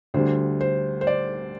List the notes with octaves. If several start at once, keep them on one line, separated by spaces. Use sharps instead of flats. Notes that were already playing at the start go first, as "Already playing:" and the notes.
D2 D3 G3 C5
C5
C5
D5